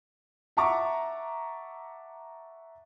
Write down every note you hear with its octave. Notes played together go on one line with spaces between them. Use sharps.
E5 F#5 A5 A#5 C#6 D6